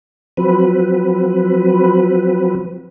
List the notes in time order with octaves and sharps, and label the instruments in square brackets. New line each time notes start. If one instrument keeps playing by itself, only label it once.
[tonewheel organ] F3 F#3 C4 B4